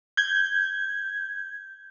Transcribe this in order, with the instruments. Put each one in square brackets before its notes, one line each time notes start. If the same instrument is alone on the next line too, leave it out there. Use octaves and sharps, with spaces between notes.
[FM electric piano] G6 G#6